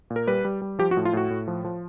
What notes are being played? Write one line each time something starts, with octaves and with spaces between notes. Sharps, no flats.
A#2
A#4
G3 B4
G3
G3
F3 G4
F#4
A2
F4
A2 F#4
A2
F3
F3